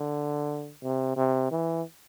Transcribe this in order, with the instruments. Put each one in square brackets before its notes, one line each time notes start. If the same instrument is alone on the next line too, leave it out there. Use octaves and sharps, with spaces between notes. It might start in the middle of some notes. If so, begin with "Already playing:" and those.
Already playing: [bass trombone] D3
C3
C3
E3